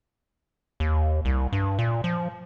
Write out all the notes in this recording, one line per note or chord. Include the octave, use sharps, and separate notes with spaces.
D#2
C2
G2
A#2
F3